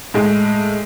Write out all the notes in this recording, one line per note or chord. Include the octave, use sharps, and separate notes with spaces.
A2 G#3